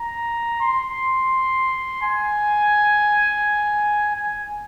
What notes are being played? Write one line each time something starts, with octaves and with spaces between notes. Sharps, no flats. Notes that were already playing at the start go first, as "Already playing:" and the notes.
Already playing: A#5
C6
G#5
G#5